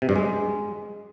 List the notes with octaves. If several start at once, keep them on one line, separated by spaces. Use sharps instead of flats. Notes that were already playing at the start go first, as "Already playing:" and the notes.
C3
G2
G#3